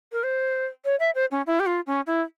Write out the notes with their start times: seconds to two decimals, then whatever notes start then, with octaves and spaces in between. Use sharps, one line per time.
0.12 A#4
0.23 C5
0.85 C#5
1.00 E5
1.15 C5
1.31 C#4
1.47 E4
1.60 G4
1.66 F4
1.87 C#4
2.07 E4